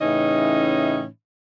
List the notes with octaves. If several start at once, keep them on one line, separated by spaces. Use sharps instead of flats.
A2 C#3 E3 C#4 D#4 D#5